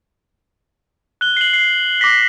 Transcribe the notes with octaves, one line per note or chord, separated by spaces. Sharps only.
F#6 G7
C7 F#7
C7
D6 A#6 B6